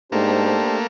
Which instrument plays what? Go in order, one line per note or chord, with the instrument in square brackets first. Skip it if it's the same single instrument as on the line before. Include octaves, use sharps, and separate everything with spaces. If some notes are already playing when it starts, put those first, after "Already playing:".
[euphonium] G#2 [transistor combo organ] A3 A#3 [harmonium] D4 G4 C5